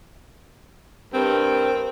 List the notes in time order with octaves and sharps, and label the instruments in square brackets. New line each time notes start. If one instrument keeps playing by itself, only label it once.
[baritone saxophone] G2 [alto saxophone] C4 [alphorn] A#4